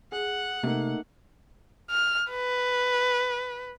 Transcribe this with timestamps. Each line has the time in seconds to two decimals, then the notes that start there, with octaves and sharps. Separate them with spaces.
0.12 G#4 F#5
0.63 C3 A3 A#3 D#4
1.90 F6
2.31 B4